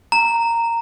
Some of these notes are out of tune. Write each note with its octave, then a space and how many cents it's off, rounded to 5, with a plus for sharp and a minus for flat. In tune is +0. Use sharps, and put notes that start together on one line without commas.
A#5 -10